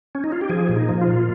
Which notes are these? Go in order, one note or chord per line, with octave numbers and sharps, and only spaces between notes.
C#4
D#4
F4
G4
F3 G#4
A#2
D#4
F3
F4
A#2